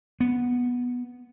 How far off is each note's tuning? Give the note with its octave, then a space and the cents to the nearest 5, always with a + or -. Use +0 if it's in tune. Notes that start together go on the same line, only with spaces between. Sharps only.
B3 -10